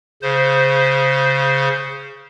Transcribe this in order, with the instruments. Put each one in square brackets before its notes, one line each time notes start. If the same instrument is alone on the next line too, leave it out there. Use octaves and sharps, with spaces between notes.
[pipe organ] C#3 C5